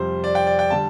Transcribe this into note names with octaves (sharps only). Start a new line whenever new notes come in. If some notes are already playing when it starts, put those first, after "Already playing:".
Already playing: F2 C3 G3 C5
D5
G5
D5
G5
D3 G3 A5